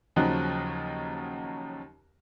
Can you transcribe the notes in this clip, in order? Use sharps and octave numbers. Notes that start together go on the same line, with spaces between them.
D#2 C#3 F3 F#3 D#5 F#6